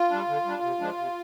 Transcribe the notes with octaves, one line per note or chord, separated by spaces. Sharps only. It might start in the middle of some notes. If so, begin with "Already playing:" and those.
Already playing: F4
G3 D4
D3
G3 D4
C3
F3 G#3 D4
C3